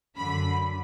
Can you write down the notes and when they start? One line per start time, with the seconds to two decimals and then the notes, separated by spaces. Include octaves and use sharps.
0.16 F#2 D3 B5